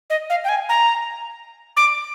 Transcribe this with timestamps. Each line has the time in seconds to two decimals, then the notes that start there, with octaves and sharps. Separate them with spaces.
0.10 D#5
0.30 F5
0.44 G5
0.49 G#5
0.69 A#5
1.77 D6